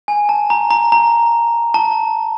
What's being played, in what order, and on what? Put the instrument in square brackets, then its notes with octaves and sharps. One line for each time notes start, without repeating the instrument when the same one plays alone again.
[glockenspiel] G#5
A5
A#5
A#5
A#5
A5